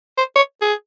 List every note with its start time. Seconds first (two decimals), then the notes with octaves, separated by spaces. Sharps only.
0.18 C5
0.36 C#5
0.61 G#4